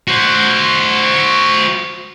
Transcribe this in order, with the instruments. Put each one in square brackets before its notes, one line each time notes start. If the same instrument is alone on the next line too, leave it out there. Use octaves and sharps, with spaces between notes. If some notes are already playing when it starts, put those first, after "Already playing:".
[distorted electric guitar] F#4 C5